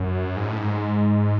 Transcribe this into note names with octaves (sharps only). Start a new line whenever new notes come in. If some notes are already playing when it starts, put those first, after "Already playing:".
Already playing: F#2
G#2
A2
G#2